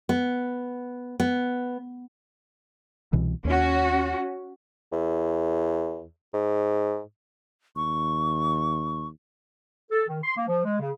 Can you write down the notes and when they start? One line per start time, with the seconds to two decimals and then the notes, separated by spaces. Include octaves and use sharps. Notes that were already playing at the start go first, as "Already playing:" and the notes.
0.09 B3
1.20 B3
3.13 C2 B2 E3
3.45 D#2 C#4 F#4
4.92 E2
6.34 G#2
7.76 D#2 C#6
9.91 A4
10.07 D#3
10.24 C6
10.36 A#3
10.48 F3
10.64 G#3
10.79 C#3